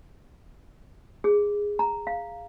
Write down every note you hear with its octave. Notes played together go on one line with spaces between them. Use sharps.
G#4
A#5
F5